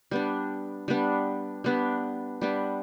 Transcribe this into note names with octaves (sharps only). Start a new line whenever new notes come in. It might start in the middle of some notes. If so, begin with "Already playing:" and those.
G3 B3 D4
G3 B3 D4
G3 B3 D4
G3 B3 D4